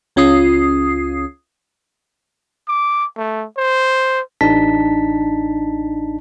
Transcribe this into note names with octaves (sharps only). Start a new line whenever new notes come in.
C#2 C#4 F4 D#6 C7
D6
A3
C5
A1 D4 D#4 A5 B6